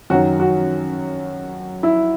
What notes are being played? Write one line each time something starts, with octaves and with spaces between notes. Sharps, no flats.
F#2 D#3 F#3 F#4
F#4
E4